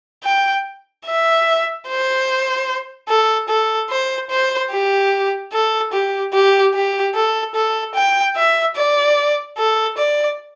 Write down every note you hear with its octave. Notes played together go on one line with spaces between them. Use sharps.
G5
E5
C5
A4
A4
C5
C5
G4
A4
G4
G4
G4
A4
A4
G5
E5
D5
A4
D5